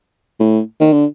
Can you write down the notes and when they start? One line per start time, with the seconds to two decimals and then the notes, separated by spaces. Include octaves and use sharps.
0.40 A2
0.80 D#3
0.93 D3